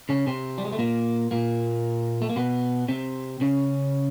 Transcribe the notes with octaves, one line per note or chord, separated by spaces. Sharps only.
C#3 C#4
C3 C4
G3
G#3
A3
A#2 A#3
A#2 A#3
A3
A#3
B2 B3
C3 C4
C#3 C#4